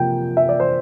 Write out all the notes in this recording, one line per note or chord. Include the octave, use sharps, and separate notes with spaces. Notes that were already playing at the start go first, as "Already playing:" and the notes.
Already playing: C3 F3 A#3 G5
E5
D5
C5